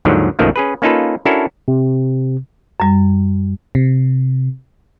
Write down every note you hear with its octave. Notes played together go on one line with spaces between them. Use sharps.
D#2 G#2 D3 D#3 F3 F#3
B1 F#2 D#3 F3 A3 A#3
C#4 G#4 B4
A#3 C#4 D#4 F4 A4 B4
C#4 D4 E4 F#4 A4 A#4
C3
F#2 G3
C3